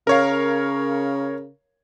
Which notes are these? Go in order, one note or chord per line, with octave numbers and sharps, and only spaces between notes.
C#3 A#4 C#5 F5